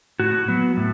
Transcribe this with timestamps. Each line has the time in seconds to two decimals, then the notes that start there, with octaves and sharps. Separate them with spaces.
0.20 A2 F#4
0.48 F#3 B3
0.77 A2